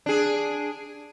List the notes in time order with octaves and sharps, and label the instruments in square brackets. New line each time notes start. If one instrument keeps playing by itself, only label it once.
[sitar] D4 G#4